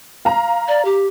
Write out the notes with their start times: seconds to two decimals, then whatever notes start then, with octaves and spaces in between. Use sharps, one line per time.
0.25 F5 A#5
0.68 D5
0.85 G4